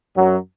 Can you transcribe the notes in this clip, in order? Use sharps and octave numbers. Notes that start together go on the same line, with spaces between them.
F#2 F#3